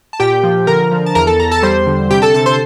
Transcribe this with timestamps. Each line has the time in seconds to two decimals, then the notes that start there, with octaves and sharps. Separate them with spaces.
0.13 A5
0.20 A#2 G4 G5
0.43 F3
0.67 D3 A#4 A#5
0.92 F3
1.06 A5
1.15 E2 A#4 A#5
1.27 A4 A5
1.39 E2 A#5
1.51 A4 A5
1.63 G3 C5 C6
1.87 D3
2.11 C3 G4 G5
2.22 A4 A5
2.34 C3 A4 A5
2.46 C5 C6